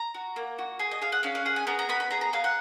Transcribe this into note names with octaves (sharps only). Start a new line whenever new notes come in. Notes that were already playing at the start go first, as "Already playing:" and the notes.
Already playing: A#5
F#4
A#3
F#4
G#4 G#5
D#5
G#4 F5
F#5
C#4 F5
F5
G#4 F#5
G#5
B3 A#5
A#5
B3 B5
B5
G#4 A#5
A#5
G#4 F5
F#5